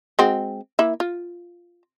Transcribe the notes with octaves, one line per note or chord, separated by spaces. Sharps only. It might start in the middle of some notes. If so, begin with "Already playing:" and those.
G#3 C4 F#4
A#3 E4 E5
F4